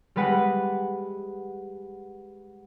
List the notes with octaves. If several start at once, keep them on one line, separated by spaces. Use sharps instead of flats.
G3 G#3 B4 F#5